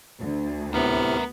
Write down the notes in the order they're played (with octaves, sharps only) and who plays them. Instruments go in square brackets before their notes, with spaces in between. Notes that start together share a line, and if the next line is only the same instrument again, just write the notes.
[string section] D2
[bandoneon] A2 C3 F6 [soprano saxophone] B3 [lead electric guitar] A#4 E5